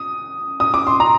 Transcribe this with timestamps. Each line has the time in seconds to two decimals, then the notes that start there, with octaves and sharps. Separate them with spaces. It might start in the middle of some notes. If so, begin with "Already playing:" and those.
Already playing: D#6
0.60 D#6
0.74 D6
0.87 C6
1.00 A#5